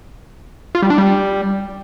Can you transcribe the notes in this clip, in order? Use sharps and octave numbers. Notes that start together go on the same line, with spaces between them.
F4
G3
D4
G3